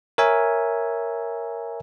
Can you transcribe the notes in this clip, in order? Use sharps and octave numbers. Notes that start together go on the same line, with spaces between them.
A#4 C#5 E5 G#5